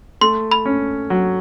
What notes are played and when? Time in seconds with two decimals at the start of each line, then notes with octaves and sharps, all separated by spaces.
0.21 A3 C6
0.51 B5
0.65 C#4
1.10 F#3